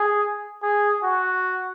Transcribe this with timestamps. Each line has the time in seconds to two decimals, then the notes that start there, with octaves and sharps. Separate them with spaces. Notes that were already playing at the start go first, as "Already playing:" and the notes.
Already playing: G#4
0.63 G#4
1.04 F#4